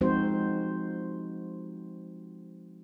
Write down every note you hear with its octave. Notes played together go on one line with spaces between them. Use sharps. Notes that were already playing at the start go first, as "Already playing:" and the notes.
F3 G#3 C4 D#4 F#4 C5